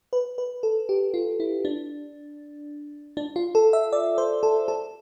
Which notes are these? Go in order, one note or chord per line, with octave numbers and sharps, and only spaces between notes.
B4
B4
A4
G4
F4
E4
D4
D4
F4
A4
E5
D5
C5
A4
A4